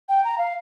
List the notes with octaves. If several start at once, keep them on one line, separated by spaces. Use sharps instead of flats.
G5
A#5
F5